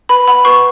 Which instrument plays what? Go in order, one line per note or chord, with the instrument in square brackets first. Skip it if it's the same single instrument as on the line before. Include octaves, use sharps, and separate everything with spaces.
[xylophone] B4 B5
F#5 B5
B4 C#6